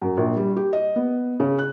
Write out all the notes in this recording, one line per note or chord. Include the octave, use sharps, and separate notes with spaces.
F#2
A#1
G3
G4
D#5
B3
C#3
F#6